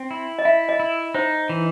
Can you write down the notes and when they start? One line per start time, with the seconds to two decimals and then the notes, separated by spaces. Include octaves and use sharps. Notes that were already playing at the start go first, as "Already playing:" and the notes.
Already playing: C4
0.11 E4
0.39 D#5
0.45 E4 E5
0.69 D#5
0.80 E4
1.14 D#4 C5
1.49 E3